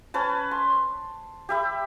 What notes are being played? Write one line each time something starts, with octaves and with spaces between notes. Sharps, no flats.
C#4 B4 A5
C6
G4 E5 B5